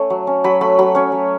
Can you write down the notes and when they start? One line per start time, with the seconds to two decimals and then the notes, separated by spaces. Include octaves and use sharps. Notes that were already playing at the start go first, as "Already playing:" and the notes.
Already playing: A3 C#4
0.10 F#3
0.27 C#4
0.44 F#3 B5
0.61 A3 B5
0.79 F#3 B5
0.95 C#4 C#5
1.12 F#3